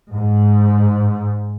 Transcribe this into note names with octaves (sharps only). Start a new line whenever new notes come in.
G#2